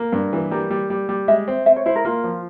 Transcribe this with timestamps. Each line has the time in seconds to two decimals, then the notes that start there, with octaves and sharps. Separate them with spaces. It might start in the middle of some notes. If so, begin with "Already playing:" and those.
Already playing: A#3
0.12 G2
0.33 E3
0.51 G3 A#4
0.70 G3
0.90 G3
1.09 G3
1.28 G#3 E5
1.48 C4
1.66 C4 E5
1.76 C#5
1.86 E4 C5
1.96 A#4
2.05 A#3 F4
2.24 F3